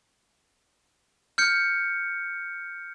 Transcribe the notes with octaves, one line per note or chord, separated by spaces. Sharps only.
F6 G6 C#7